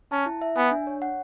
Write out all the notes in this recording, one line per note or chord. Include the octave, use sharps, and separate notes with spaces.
C#4 A5
E4
E5
B3 G#5
D4
C#5
F#5